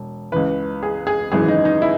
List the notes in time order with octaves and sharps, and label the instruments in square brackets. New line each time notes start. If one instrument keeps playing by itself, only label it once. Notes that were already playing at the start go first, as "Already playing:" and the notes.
Already playing: [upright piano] E1
C#2 C#3 E3 B4
G#4
G#4
G#1 F#2 C#3 E3 G#4
D#4
D#4
E4